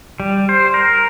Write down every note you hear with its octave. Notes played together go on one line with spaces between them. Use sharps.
G3
C5
A#4